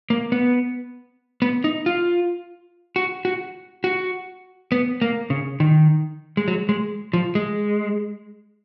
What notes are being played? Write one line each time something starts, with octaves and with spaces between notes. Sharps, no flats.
A#3
B3
B3
D#4
F4
F#4
F#4
F#4
B3
A#3
C#3
D#3
G#3
F#3
G#3
F3
G#3